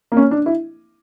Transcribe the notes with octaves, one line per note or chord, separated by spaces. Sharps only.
A#3
C#4
D4
E4